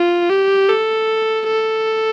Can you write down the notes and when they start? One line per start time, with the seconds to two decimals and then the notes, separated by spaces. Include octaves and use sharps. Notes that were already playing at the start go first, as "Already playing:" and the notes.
Already playing: F4
0.30 G4
0.69 A4
1.47 A4